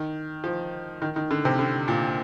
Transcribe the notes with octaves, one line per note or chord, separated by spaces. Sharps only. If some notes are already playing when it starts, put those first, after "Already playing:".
Already playing: D#3
F3
D#3
D#3
D3
C3
D3
A#2